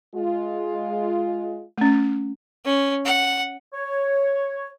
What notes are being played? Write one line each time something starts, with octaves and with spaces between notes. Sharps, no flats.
G#3 F4
A3 C#4
C#4
F#5
C#5